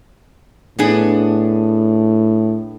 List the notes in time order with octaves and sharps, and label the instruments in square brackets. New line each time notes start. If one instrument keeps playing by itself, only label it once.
[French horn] A2 [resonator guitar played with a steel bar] B3 D4 G#4